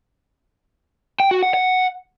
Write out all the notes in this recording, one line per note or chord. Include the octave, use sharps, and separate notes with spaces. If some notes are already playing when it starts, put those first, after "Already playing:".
G5
F#4
F#5
F#5